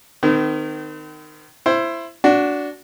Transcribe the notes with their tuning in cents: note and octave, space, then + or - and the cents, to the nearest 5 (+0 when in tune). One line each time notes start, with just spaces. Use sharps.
D#3 -20 C4 -45
E4 +20 C5 +10
D4 -15 F#4 +0